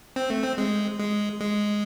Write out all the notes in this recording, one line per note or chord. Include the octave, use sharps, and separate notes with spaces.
C4
A3
C4
G#3
G#3
G#3